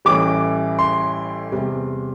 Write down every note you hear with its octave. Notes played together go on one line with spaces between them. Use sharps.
A1 A2 E3 G3 D6
C6
E2 C3 G3